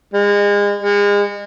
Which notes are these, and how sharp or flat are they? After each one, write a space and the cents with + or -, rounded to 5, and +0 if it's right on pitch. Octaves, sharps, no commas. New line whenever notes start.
G#3 -35
G#3 -35